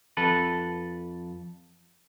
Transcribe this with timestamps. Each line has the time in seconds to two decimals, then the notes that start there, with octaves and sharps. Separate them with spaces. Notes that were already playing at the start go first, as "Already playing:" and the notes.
0.17 F2 A4 B4